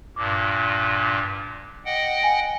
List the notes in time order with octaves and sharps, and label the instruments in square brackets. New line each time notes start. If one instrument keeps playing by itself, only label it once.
[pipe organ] G2 A#2 [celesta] D6
[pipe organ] D#5 F#5 G5
[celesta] G#5